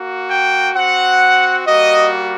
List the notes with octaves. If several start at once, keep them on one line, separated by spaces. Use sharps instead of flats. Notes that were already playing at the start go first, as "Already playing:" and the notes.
Already playing: A#3 F#4
G5
C4 F#4 F#5
G3 A#3 F#4 D#5